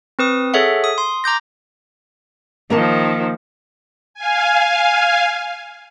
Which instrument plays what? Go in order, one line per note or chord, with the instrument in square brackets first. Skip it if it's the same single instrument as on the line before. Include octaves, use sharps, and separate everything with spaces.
[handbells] C4 B4 D#6
G#4 A4 C#5 E5 F#5
D#6
C6
A#5 D6 G6 A#6
[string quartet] D#3 F3 [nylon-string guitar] A#3 A#4 A5
[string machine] F5 G#5